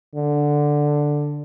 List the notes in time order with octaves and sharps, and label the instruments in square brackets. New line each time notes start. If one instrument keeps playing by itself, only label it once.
[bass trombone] D3